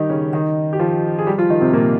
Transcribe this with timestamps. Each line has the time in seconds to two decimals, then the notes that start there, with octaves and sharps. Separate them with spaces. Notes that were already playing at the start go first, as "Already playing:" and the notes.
Already playing: D#3 G3 D#4 G4
0.10 C#3 C#4
0.33 D#3 D#4
0.73 G4
0.79 F3 F4
1.18 G#4
1.26 G3 G4
1.38 F3 F4
1.50 D#3 D#4
1.61 C3 C4
1.73 A#2 A#3